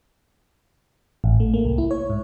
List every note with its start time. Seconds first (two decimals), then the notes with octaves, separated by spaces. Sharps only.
1.24 A1
1.40 A3
1.54 A#3
1.65 C2
1.78 E4
1.91 C#5
2.10 G#2